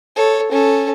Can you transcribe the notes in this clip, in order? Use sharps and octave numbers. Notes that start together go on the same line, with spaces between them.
A4 C#5
C#4 A4